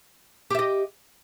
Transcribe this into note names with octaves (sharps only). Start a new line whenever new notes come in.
G4 D#5 E5